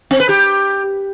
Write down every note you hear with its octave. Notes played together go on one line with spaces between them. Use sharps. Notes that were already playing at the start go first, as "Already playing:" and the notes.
C4
B4
G4